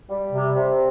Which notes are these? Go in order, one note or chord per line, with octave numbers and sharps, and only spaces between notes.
G3
C3
C3